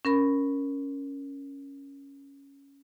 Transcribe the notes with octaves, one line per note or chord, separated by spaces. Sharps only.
C#4 A#4 B5